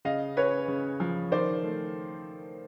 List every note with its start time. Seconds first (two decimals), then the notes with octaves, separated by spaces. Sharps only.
0.05 C#3 D#5 F5
0.37 C#4 B4 C#5
0.68 C#3
1.00 F3
1.31 D#3 C5 D5
1.63 A3